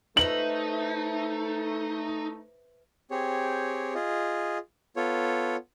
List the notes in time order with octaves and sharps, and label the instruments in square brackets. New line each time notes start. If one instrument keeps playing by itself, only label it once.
[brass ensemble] A3 [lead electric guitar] D#4 [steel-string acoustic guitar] B4 C5 E5 [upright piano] F#7
[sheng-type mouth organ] C4 G4 G#4 C#5
F4 G#4 D#5
B3 F4 A4 C#5